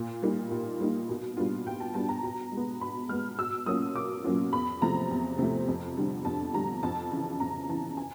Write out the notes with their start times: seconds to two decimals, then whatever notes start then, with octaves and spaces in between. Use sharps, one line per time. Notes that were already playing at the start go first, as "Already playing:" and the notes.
Already playing: A#2
0.23 G3 A#3 D#4
0.51 A#2
0.80 G3 A#3 D#4
1.09 B2
1.37 G3 B3 D4 F4
1.67 B2 G5
1.80 A5
1.94 G3 B3 D4 F4 A5
2.08 A#5
2.23 B2 A#5
2.52 G#3
2.57 B3
2.81 B2 B5
3.09 G#3 B3 F6
3.39 B2 E6
3.66 F#3 A#3 C#4 F4 D#6
3.95 B2 D6
4.24 F#3 A#3 C#4 F4
4.53 E2 B5
4.82 C3 F3 A3 A#5
5.10 E2
5.39 C3 F3 A3
5.68 F2
5.97 D3 G3
6.25 F2 A5
6.54 D3 G3 A#5
6.83 F2 A5
7.12 C#3 E3 A5
7.40 F2 A#5
7.69 C#3 E3 A5
7.97 G#5